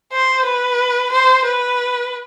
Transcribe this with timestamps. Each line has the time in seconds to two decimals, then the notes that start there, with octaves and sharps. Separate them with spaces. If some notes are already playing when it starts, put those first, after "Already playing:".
0.13 C5
0.45 B4
1.12 C5
1.45 B4